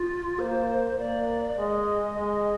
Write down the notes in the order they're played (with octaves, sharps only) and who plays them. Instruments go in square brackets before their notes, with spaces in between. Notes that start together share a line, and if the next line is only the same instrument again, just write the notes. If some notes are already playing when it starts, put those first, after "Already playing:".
Already playing: [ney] F4
[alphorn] A#3 [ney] C5
[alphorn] A#3 [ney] D5
[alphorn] G#3 [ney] D#5
[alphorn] G#3